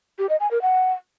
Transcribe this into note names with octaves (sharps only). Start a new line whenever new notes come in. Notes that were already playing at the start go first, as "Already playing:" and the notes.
G4
D#5
G#5
A#4
F#5